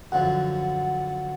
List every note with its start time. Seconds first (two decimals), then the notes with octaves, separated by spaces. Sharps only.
0.12 F#2 D3 F3 F#5